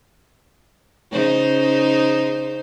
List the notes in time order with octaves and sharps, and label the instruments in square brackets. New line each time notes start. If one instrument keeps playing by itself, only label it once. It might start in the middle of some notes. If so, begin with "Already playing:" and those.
[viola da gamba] C#3 D#4 C5